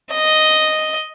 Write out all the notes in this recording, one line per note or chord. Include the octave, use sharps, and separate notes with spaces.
D#5